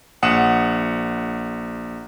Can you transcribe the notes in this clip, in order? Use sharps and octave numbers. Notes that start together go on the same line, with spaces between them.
A#1 F#5 D#6 E7